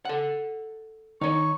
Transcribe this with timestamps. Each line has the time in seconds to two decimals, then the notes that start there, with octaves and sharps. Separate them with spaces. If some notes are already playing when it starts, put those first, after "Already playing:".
0.05 A4 F#5
1.21 D#3 D#4 C#5 C#6